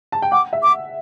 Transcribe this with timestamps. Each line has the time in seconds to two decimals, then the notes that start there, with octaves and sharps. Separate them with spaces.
0.12 A5
0.22 G5
0.32 F#5 D6
0.53 E5
0.63 D6